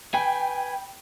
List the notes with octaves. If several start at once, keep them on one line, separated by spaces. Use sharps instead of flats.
B4 G5 G#5 B5